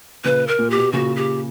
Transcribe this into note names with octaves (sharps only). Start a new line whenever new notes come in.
A#2 C#3 B4
A#4
A#2
G4
B2
A#2 C#3 F#4
G4